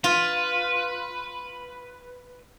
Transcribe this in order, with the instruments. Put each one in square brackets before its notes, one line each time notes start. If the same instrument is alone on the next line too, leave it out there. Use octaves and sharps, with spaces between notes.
[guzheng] F4 [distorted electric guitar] B4